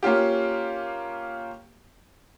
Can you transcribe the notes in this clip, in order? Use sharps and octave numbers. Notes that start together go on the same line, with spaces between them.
A#3 C#4 F4 G4